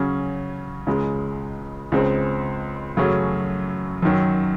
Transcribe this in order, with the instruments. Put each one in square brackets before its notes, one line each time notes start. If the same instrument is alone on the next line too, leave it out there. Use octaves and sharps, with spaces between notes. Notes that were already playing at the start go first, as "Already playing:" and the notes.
Already playing: [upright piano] C#3 F#3 C#4
C#2 C#3 G#3
C#2 C#3 G#3 C4
F#2 C#3 F#3 A3 C#4
F#2 D#3 F#3